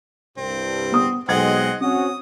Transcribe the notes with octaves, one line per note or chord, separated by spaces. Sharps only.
C2 G2 C4
B3 D#6
B1 G#3 C4 D#5 F#5 G#6
C4 C#4 F#4 D#6